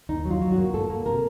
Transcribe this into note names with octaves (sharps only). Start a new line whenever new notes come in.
D#2 D#4
F#3
F4
F#3
F#4
A#3
A#3 A4
A#3
C3 A#4